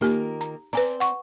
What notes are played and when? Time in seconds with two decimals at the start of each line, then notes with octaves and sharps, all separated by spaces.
0.01 D#3 A#3 D#4 F4 G4 G#5
0.41 A#5
0.73 C4 B4 D5 G#5 A#5
1.00 F#5 C#6